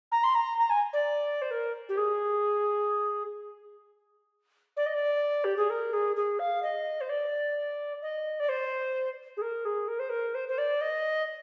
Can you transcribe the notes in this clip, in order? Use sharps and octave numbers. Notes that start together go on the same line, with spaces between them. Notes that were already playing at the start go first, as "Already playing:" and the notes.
A#5
C6
A#5
A#5
G#5
D5
C5
A#4
G4
G#4
D5
D#5
D5
G4
G#4
A#4
G#4
G#4
F5
D#5
C5
D5
D#5
D5
C5
G#4
A#4
G#4
A#4
C5
A#4
C5
C5
D5
D#5